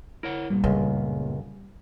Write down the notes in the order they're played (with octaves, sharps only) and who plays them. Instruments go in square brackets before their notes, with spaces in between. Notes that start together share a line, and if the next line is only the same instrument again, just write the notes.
[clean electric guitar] E4 C#5 F#5 [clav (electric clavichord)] A#4
[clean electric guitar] G2 A#2 [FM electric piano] G3
[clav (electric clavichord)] C#2 F#2 [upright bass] C#3